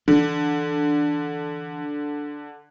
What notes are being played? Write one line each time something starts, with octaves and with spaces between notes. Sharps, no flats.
D3 E3 D4